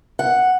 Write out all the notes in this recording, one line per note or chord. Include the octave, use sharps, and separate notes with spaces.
F#5